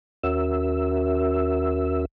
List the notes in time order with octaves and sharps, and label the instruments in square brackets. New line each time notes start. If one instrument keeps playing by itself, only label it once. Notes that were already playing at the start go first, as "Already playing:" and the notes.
[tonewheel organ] D#2 C#4 F#4 A#4 E5 E6